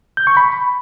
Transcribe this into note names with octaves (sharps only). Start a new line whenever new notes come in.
G6
C#6
B5